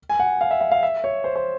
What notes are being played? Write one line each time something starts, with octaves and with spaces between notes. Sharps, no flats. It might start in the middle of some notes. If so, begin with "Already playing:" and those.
G#5
F#5
F5
E5
E5
F5
E5
C#5
C5
C5